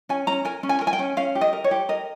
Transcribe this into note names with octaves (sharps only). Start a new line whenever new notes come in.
C#4 G#5
C#4 A#5
A#4 G#5
C#4
G#5
A#4
G#5
G5
C#4
C#4 F5
G4
D#5
A#4
C#5
G4
A#4 D#5